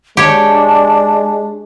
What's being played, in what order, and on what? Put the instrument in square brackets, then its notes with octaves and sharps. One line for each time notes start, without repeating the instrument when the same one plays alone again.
[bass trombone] G#3 [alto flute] D4 [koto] G4 C#5